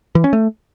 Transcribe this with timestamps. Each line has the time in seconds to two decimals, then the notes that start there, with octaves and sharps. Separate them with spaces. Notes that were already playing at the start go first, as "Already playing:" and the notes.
0.15 E3
0.24 C#4
0.33 A3